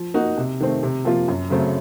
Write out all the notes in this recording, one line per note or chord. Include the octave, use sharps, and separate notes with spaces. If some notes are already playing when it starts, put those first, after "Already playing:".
Already playing: F3
A#3 D#4 F#4
C3
D#3 A3 C4
C3
F3 A#3 F4
F#2
C#3 F#3 A3 C4